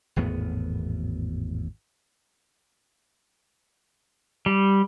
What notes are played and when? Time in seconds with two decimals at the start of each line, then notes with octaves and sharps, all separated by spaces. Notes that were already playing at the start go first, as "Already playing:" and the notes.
0.16 G#1 E2 A2 B3
4.46 G3